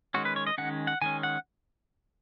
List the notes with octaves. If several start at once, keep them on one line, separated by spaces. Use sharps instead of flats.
D#3 G#3 C#4 F#4
B4
C#5
D#5
D#3 G#3 C#4 F#5
F#5
D#3 G#3 C#4 G#5
F#5